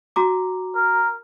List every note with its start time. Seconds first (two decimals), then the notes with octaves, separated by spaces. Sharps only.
0.16 F#4 A#5 D6
0.75 A#4